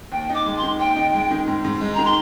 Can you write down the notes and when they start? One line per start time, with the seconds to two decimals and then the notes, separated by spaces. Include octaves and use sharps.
0.12 D#2 G5
0.29 D#4
0.35 D6
0.46 G#3
0.58 C6
0.63 D#3
0.79 D#2 G5
0.96 D#4
1.14 G#3
1.31 D#3
1.48 G#2
1.64 G#2
1.81 G#3
1.95 D#3 A#5
2.05 C6